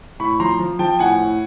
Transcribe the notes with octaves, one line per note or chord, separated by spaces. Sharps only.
A2 B5 C#6
F3 A#5 C6
F3
F3 G5 A5
A2 F#5 G#5
A2